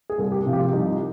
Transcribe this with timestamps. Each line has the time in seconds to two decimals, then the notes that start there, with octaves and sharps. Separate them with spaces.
0.10 G#4
0.18 C2 A#4
0.32 G4
0.46 C3 F3
0.53 G4
0.59 F4
0.72 C2 D#4